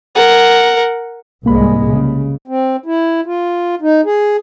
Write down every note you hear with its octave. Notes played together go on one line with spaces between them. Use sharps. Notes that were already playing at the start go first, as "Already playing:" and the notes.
A#4 F#5
C2 G#2 G#3 A#3 B5
C#3
C4
E4
F4
D#4
G#4